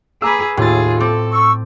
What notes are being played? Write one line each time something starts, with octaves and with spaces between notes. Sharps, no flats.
G#4 B4 A#5 D6 E6
D#2 A2 F4 G#4 A6
C4 A4 D6
C#6 E6